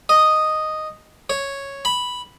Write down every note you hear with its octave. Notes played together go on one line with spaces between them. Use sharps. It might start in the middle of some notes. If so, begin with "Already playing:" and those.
D#5
C#5
B5